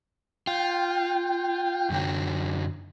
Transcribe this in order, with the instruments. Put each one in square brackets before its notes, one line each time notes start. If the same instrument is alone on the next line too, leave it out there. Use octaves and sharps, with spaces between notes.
[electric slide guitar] F4 [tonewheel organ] G5
[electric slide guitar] F#2 D3 F#3